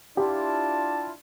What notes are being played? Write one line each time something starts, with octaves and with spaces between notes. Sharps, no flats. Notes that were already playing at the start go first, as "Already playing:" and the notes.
D4 E4 F4 G4 A5